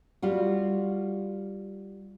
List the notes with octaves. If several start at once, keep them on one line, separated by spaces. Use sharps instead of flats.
G3 F4 F#4